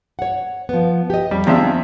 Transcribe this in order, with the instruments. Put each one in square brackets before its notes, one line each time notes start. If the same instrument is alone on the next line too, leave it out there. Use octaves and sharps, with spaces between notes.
[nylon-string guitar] C#5 F#5
F3 B3
G4 D#5
[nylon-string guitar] F2 [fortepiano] G3
[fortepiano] E2 F3 E5 [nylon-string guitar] A#3 C4 D4